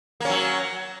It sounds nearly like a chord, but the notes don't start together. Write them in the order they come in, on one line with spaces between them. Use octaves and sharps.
A#3 C#4 F#3